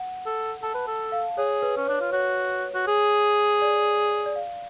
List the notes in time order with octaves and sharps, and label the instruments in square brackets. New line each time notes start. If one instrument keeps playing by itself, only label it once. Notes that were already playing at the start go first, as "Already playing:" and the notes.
Already playing: [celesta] F#5
[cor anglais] A4
[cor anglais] A4 [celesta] A5
[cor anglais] B4
A4
[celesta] F5
[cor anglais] G#4 [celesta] C#5
[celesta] B4
[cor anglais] C#4
[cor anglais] D4 [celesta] C#5
[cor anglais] F4
[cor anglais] F#4 [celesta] C#5
[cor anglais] F#4
G#4
[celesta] D5
D5
F5